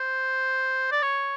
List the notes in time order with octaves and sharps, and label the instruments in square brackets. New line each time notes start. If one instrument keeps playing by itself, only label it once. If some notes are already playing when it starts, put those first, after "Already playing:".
Already playing: [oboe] C5
D5
C#5